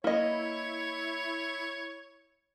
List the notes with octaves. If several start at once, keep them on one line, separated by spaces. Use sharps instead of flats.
A#3 E4 C#5 D#5